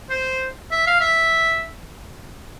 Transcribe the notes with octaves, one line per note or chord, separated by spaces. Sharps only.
C5
E5
F5
E5